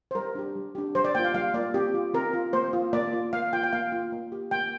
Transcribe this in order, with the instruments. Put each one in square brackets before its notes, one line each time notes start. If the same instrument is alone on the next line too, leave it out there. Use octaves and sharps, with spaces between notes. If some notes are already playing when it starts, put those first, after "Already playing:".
[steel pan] C5
G3 A#4
D4 G4
G3
D4 G4
G3 C5
D5
A#3 F4 G5
F5
G3 F5
A#3 F4 D5
C4 G4
F4
C4 A#4
F4
A#3 C5
F4
A#3 D5
F4
A#3 F5
F4 G5
G5
A#3 F5
F4
A#3
G4
A#3 G5